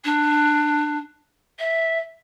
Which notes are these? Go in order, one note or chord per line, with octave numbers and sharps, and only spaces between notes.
D4
E5